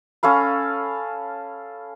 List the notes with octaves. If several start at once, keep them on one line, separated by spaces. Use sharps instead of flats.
C#4 A4 F5 B5